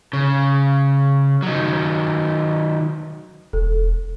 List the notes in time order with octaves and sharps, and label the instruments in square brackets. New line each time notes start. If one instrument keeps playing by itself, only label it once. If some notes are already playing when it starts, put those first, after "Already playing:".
[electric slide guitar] C#3
D#3 F#3
[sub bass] E1 [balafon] A4